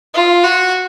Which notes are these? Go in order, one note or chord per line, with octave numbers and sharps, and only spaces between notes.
F4
F#4